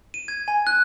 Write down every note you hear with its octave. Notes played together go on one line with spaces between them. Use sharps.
D#7
G#6
G#5
F#6